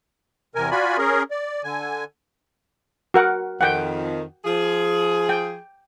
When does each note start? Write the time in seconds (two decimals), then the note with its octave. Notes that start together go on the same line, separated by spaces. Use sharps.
0.55 E2 C3 A#4 G#5
0.71 F4 F#4 D5 G#5 B5
0.97 C#4 G#4 A#4
1.31 D5
1.64 D3 G#5
3.14 F#4 A#4 F#5
3.61 F2 D#3 F#5 G5
4.45 F3 G#4
5.29 G5